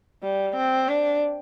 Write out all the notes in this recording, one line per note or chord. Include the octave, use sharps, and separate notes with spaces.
G3
C4
D4